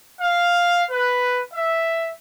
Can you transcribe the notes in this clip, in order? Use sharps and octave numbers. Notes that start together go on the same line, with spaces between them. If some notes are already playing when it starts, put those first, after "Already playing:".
F5
B4
E5